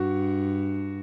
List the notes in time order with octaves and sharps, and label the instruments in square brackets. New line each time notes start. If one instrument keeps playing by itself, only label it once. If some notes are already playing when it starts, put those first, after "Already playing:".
Already playing: [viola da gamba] G2 [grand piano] F#4